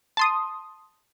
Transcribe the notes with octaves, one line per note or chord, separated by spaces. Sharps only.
A5 C6 D#6